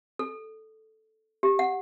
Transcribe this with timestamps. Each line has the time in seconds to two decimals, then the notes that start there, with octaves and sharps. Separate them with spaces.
0.19 A4
1.43 G4
1.59 F#5